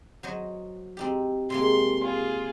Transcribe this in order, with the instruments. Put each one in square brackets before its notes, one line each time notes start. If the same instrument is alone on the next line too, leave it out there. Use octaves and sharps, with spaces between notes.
[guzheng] F#3 C5 D#5
C4 D#4 G4
[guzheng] C3 G#3 A#3 [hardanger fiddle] C6
[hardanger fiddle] F4 G#4